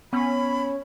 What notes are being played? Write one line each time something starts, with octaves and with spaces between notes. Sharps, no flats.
B3 C#4 B5